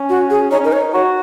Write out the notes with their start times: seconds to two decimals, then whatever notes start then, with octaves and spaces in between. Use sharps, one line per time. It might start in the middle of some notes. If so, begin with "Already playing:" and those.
Already playing: C#4
0.09 F#4
0.30 G#4
0.51 D#4 C#5
0.59 C#4
0.65 D#4 A#4
0.73 C#5
0.94 F#4 C#5